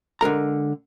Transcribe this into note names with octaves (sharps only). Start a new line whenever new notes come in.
D3 G#3 A#4 A#5